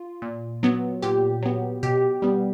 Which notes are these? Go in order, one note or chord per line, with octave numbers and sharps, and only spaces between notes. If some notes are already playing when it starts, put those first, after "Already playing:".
Already playing: F4
A#2
F#3 B3
A#2 G4
F#3 B3
B2 G4
G3 B3